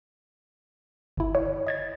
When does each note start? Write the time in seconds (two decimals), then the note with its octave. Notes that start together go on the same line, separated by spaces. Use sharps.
1.17 G1 E4
1.35 C#5
1.67 D#5 G#6 A6